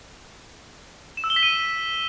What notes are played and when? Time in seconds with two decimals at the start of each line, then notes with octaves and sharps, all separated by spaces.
1.17 E7
1.24 E6
1.30 G7
1.36 B6
1.43 D#7